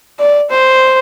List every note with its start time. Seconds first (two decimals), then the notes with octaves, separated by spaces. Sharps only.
0.19 D5
0.50 C5